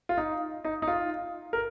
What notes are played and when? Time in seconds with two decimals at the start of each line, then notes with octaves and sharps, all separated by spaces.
0.09 F4
0.17 D#4
0.64 D#4
0.82 D#4
0.88 F4
1.53 A#4